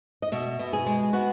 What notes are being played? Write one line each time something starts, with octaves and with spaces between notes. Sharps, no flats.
D#5
B2 E5
B2
G#4
G#3
B3 F#4